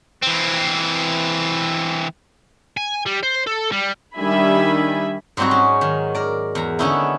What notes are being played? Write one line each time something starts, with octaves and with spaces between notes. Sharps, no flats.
E3 C4
G#5
G3
C5
A4
G3
D#3 G3 D4 E5 G#5 B5
G#2 F#3 G3 C4 D#4 F#4
C#4
D#3
A#4 D5
E2 A#5
D3 B3 C#4 D#4 E4